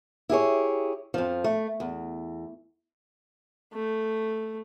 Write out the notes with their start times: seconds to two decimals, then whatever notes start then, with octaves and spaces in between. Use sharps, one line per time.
0.29 E4 G4 G#4 C#5
1.14 F2 F3
1.44 A3
1.80 E2
3.73 A3